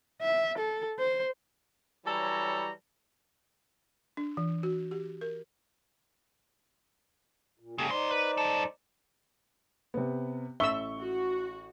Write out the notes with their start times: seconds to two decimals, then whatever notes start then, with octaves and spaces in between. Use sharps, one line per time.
0.22 E5
0.58 A4
0.99 C5
2.06 E3 F#3 G3 A4 C#5 A#5
4.17 D4
4.37 E3
4.63 F#4
4.91 G4
5.21 A#4
7.59 A#2
7.78 C#3 G#3 A#3 G4 A4
7.91 G3 D#4 C5 D5 C6
8.11 B4
8.37 F#2 A4
9.94 C3 B3
10.60 A1 E5 C#6 E6 G7
10.99 F#4